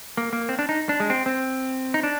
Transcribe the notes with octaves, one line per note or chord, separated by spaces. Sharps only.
A#3
A#3
C4
D4
D#4
D4
G#3
C4
C4
D#4
D4